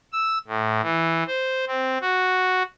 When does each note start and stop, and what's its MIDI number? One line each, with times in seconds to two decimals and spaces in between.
0.13 0.38 88
0.47 0.81 45
0.83 1.24 52
1.27 1.65 72
1.67 1.98 60
2.02 2.63 66